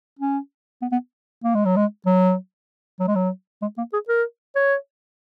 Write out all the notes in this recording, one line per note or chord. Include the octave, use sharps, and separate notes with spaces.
C#4
B3
B3
A#3
G#3
F#3
G#3
F#3
F#3
G#3
F#3
G#3
A#3
G#4
A#4
C#5